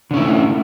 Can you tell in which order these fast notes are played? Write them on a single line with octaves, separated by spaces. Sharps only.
D3 C#4 E4 A3